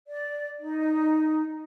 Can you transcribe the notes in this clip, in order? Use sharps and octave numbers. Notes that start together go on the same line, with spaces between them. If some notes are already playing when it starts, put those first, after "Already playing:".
D5
D#4